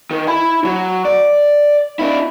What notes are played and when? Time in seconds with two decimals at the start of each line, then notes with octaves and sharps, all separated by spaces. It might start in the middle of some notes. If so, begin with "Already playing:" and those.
0.11 D#3
0.28 E4 B5
0.64 F#3
1.05 D5
1.99 D4 E4